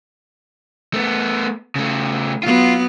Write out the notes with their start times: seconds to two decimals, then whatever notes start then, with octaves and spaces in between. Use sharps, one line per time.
0.94 A3 B3
1.76 C#3 A3
2.43 F#3 B3 F4